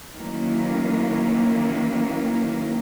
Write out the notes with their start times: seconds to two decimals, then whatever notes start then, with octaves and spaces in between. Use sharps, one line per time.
0.16 D#3 E3 F#3 A#3 C#4